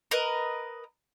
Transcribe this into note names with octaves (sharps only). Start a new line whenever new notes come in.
A#4 B4 D#5